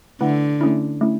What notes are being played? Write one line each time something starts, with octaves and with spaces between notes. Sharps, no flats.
D3 A3 E4 B4 F#5
A3 C#4 E4
A3 C#4 E4